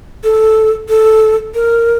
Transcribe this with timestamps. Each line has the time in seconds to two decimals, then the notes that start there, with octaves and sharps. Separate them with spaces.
0.24 A4
0.89 A4
1.55 A#4